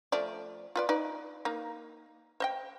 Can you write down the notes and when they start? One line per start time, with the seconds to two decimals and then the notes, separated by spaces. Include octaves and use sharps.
0.12 F3 A3 D5
0.76 F4 B4 D5
0.89 D#4 B4 D5
1.45 A#3 D#4
2.40 C5 D#5 G5